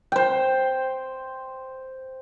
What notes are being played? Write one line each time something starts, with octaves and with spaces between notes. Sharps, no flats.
C5 G5